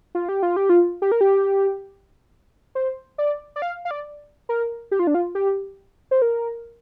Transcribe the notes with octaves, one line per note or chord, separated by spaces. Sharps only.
F4
G4
F4
G4
F4
G4
A#4
G4
C5
D5
D5
F5
F5
D5
A#4
G4
F4
D4
F4
G4
C5
A#4